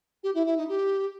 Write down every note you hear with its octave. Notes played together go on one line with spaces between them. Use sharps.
G4
E4
E4
D#4
G4